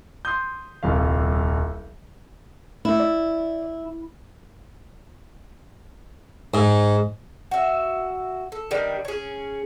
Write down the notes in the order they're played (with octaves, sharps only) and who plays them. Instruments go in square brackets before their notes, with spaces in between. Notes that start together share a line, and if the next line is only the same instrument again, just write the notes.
[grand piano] C6 D#6 G6
D#1 C2 F5
[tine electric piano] A3 [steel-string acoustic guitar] E4
[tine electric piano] D5
[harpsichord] G#2
[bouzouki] F#4 E5
A4
D#3 G3 D4 B4
C#4 G#4